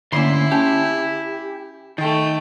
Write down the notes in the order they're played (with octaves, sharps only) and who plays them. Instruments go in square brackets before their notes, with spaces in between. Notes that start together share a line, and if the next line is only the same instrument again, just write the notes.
[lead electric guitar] D2 C6 [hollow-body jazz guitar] D3 A#3 C#4 [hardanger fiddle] E4
[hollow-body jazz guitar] C#4 A5 [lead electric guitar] G4
[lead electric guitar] D#3 [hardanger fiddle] A3 G5